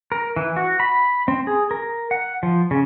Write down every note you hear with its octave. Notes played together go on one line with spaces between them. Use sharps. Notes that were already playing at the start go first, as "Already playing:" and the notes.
A#4
E3
F#4
B5
C4
G#4
A#4
F#5
F3
C#3